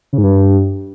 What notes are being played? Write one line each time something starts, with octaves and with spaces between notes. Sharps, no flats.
C#3
G#2
G2